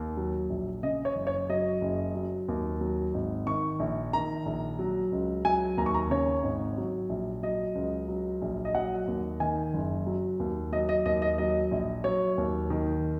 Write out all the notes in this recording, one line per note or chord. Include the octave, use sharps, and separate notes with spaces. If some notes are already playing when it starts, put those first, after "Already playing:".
Already playing: D#2
F#3
A#1
C#3 D#5
C#5
F#1
C#5
F#3 D#5
F#1
F#3
D#2
F#3
G#1
D#3 C#6
A#1
D#3 A#5
A#1
F#3
C#2
F#3 G#5
D#2 A#5
C#6
A#5
C#3 C#5
G#1
F#3
A#1
F#3 D#5
C#2
F#3
A#1
D#5
F#3 F#5
D#2
D#3 G#5
F#1
F#3
D#2
F#3 D#5
D#5
D#2 D#5
D#5
F#3 D#5
A#1
F#3 C#5
D#2
D#3